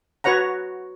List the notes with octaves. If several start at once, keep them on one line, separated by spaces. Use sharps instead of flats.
F#4 B4 C#5 F#5 A#5